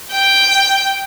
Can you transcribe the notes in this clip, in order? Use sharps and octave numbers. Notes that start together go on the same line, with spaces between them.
G5